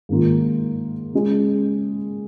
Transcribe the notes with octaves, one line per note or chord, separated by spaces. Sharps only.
G#2 D#3 A#3 F4
C#3 G#3 C#4